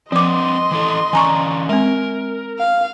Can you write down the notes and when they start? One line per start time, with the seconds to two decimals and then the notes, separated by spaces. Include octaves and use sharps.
0.12 F3 C4 B4 D#5 C6 D6
0.71 E3 E4 A4
1.13 E3 C#4 D5 G#5 A#5 C#6
1.69 G#3 C4 A#4
2.59 F5